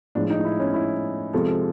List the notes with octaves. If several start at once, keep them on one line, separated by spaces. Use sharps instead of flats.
A2 F3 G#3 D4
D#4
D#4
E4
C#4
E4
C3 F3 G#3 A4